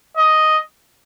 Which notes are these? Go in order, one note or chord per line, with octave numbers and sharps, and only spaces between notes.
D#5